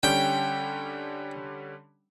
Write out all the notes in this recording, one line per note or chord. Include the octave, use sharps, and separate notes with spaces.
D3 G3 C#4 G5